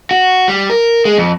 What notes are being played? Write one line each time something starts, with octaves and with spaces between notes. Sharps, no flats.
F#4
G3
A#4
G#3
F2